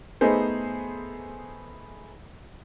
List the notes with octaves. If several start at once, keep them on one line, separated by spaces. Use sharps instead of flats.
A3 B3 D#4 G#4 C5